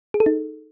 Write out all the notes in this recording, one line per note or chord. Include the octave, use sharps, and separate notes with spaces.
G#4
A4
D#4